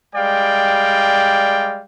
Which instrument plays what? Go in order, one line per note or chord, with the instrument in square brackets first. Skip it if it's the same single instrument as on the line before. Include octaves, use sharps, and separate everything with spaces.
[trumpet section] G3 G#3 D5 F5 G5